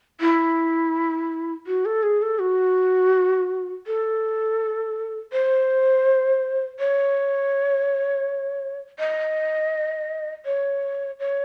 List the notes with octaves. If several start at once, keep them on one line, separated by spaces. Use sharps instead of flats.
E4
F#4
A4
G#4
A4
F#4
A4
C5
C#5
D#5
C#5
C#5